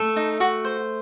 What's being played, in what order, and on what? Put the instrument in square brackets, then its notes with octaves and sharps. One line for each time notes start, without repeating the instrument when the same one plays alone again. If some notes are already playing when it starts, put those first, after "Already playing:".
Already playing: [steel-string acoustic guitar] A3 [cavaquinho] A4
[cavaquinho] D#4
F#4
C5